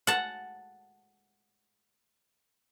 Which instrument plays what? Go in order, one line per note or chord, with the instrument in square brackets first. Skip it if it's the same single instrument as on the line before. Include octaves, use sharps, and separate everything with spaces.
[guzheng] F#5 A5